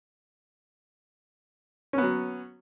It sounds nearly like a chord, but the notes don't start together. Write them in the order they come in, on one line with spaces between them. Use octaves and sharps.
C#4 B3 F#3